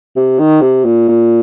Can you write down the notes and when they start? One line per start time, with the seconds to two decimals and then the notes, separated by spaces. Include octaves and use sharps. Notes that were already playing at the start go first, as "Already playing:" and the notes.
0.16 C3
0.39 D#3
0.62 C3
0.85 A#2
1.08 A#2